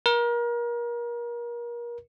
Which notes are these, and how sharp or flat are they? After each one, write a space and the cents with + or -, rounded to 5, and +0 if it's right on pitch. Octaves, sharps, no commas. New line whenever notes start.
A#4 +30